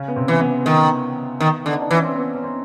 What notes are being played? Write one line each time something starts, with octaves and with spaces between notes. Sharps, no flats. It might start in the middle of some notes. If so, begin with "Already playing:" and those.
Already playing: C#3 C#4
B3
C3 C4
E3
B3
D#3 B3
D#3
D3
D#4
D4
E3 C#4
C4
B3
C#4
C4